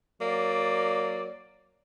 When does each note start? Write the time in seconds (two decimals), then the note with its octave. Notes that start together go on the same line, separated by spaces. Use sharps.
0.21 F#3 A#3 D5